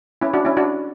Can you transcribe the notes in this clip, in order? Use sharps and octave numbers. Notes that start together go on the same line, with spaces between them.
C#4 E4
D4 F#4
C#4 E4
D4 F#4